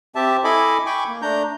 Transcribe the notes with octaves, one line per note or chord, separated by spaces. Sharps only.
C4 G4 E5 A5
E4 A4 D#5 G#5 B5 D6
G5 G#5 B5 C#6 D6
A#3
A3 D4 A#5 G6